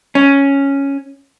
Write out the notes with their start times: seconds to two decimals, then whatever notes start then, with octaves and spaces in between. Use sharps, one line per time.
0.15 C#4